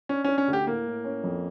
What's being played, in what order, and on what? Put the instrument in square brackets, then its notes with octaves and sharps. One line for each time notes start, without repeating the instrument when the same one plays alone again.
[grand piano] C#4 [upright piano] D4
[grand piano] C#4 [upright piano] D4
[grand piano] C#4
[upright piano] D2
[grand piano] G4
[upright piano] A2 [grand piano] A#3
[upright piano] A2
C#4
F2